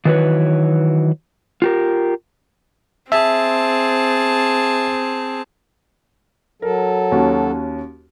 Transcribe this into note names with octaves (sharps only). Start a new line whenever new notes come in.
D#3 E3 F#3 F#4 B4 C#5
F4 G4 A#4
C4 G#4 E5 A5
F#3 A4 A#4
D#2 C#4 F#4